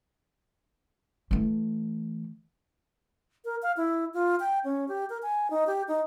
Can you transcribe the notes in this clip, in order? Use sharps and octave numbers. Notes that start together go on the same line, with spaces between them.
E3 A3
A#4
F5
E4
F4
G5
C#4
G4
A#4
G#5
D#4
G4
D#4